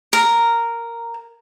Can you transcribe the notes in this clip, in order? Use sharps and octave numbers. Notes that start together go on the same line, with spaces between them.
A#4